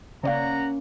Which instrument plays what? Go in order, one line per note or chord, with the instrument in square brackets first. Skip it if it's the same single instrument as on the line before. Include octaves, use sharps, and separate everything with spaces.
[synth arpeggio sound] C#3 D5 F5 [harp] A#3 C#4 [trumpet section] F#5 A#5